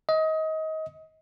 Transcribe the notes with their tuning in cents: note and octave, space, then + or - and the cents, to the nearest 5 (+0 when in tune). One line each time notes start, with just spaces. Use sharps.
D#5 +25